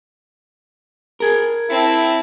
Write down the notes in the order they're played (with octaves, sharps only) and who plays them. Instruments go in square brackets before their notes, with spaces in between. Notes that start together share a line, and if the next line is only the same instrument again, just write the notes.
[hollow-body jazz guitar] G#4 A#4
[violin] C4 A5 [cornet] E4